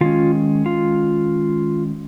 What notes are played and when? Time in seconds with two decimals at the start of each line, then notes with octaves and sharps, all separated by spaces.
0.01 D#3 G#3 C#4 F4
0.66 F4